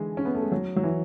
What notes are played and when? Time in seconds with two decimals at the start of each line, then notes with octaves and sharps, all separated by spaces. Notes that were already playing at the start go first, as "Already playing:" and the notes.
Already playing: D3 E3 G#3
0.17 C#4
0.25 B3
0.35 A3
0.42 G#3
0.52 F#3
0.76 F#3
0.83 E3